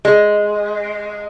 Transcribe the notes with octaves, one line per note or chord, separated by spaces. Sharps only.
G#3